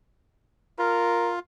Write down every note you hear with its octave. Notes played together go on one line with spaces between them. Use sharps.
F4 A#4